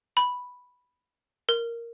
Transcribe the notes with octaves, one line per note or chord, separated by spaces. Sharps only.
B5
A#4